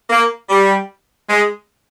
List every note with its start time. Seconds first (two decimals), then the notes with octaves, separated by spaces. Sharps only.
0.10 A#3
0.49 G3
1.29 G#3